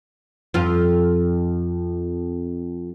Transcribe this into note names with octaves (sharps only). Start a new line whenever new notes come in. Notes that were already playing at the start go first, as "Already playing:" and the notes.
F2 F4